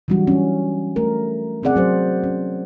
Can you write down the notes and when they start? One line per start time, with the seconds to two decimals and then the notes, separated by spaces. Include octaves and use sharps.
0.08 E3 F#3 G3 D4 F#4
0.27 C#4 D4
0.96 A3 A#4
1.63 C3 C4 C#4 G#4 D5 F#5
1.76 F#3 F#4 C5
2.24 C#4